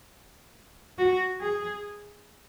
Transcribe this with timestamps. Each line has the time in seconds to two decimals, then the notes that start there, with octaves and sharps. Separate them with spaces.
0.99 F#4
1.41 G#4